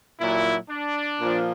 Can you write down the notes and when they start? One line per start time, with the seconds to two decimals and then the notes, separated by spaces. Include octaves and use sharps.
0.20 A#2 F#3 E4
0.70 D4
1.20 A#2 F3